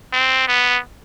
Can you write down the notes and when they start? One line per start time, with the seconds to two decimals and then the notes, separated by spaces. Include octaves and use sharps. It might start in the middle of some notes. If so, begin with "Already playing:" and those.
0.13 C4
0.48 B3